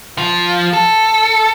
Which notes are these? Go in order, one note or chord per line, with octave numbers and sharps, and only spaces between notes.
F3
A4